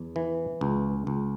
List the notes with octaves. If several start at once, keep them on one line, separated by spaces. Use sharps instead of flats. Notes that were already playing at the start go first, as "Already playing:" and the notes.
Already playing: E2
E3
C#2
C#2